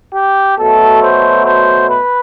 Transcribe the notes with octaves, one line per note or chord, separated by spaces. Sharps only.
G4
B2 F#3 A3 A4
C5
C5
B4